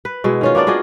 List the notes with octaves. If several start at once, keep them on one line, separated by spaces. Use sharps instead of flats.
B4
B2 G#3 E4
D#3 C#4 F4
A#3 B3 D4 D5
F4 F#4 G#4 D#5